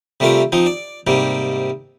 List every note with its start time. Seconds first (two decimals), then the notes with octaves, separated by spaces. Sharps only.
0.20 C3 G3 A3 F4 A#4
0.52 F3 C4 D#4
0.66 D5
1.07 G#2 C3 G3 A#3